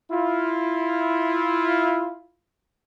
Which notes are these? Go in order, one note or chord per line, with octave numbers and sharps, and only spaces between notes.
E4 F4